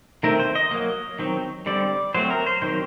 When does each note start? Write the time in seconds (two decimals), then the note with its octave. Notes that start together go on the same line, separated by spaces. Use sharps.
0.23 D#3 A3 C4 A#4
0.40 C5
0.55 D#5
0.71 F#3 A#3
1.19 D#3 F#3 C4
1.66 D3 G3 C4 D5
2.14 F#3 A3 C4 C5
2.30 A#4
2.46 C5
2.62 D#3 F#3 C4 C5